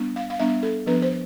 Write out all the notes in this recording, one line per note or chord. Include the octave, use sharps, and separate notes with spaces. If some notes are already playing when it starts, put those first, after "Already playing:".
Already playing: G3 B3 D4
F5
F5
G3 B3 D4 E5
A4
F3 B3 D4 B4
C5